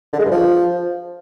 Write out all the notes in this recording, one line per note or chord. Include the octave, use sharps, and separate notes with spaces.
D3
G#3
G2
F3